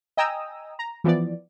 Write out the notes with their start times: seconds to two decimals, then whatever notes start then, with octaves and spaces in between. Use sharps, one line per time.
0.17 D#5 G5 G#5 A#5 D#6 E6
0.79 A#5
1.04 E3 F3 B3 D5